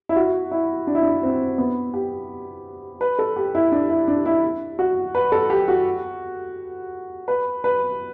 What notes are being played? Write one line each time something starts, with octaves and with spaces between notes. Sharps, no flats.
E4
F#4
E4
D4
E4
D4
C4
B3
G4
B4
A4
G4
E4
D4
E4
D4
E4
F#4
B4
A4
G4
F#4
B4
B4